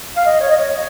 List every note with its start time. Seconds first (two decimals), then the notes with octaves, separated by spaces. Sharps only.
0.16 F5
0.26 D#5
0.40 C#5
0.50 D#5
0.56 C#5